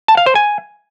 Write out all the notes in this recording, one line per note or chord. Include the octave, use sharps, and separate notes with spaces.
A5
F5
C5
G#5